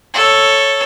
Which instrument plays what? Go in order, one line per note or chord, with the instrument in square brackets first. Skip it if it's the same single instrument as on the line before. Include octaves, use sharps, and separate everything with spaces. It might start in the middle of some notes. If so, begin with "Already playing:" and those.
[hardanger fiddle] A4 C#5